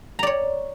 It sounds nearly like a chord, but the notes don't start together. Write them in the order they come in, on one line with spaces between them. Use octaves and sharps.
A#5 D5 C#5